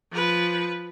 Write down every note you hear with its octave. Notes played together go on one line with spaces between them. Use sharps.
F3 B4